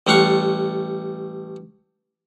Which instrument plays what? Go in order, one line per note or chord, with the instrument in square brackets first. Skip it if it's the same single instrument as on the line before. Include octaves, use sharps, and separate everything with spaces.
[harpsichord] A1 G3 A3 F5 F#5 C#6